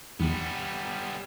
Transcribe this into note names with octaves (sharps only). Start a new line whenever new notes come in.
E2 G3 B3